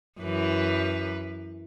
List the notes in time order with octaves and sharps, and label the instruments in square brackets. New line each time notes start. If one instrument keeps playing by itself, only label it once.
[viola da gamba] F#2 E3 B4